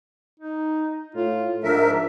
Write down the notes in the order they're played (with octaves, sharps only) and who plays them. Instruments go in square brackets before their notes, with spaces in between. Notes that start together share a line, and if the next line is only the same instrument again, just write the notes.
[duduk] D#4
[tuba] A2 [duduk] F4
[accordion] G#2 A#4 E5 [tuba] F3 [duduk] D4